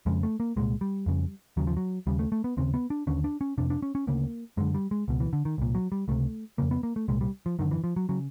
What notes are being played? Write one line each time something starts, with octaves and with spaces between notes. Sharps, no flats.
F2 C#3 G#3
A3
A#3
C2 A#2 G#3
G3
F2 C#3
D#2 C#3 F#3
F3
F#3
D#2 C#3 G3
A3
A3
B3
D#2 C#3 C4
B3
D4
D#2 D3 C#4
D4
C#4
F2 C3 D4
D4
C#4
C#4
D2 C#3 A#3
F#2 D3 G#3
G3
G#3
C#2 B2
E3
D3
D#3
C2 A#2
F#3
G3
C#2 C3 A3
F2 C#3 A#3
B3
A#3
A3
C2 A#2 G#3
G3
F3
F#2 D3 D#3
E3
F3
F#3
C#3 F#3